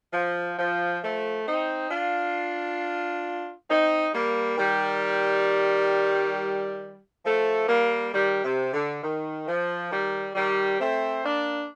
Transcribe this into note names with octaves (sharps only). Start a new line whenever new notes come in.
F3
F3
F3 A3
C4 D#4
D4 F4
C4 D#4
G3 A#3
D#3 G3
F3 A3
G3 A#3
D#3 G3
C3
D3
D#3
F3
D#3 G3
D#3 G3
A3 C4
A#3 D4